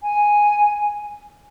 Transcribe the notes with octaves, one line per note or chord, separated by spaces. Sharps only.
G#5